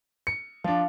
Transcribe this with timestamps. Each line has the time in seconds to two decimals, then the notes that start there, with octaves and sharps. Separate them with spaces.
0.27 C#7
0.64 F3 D4 F5